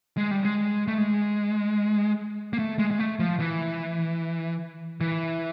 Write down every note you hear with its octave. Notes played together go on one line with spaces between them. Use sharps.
G#3
G3
G#3
A3
G#3
A#3
A3
G#3
G#3
A3
F3
E3
E3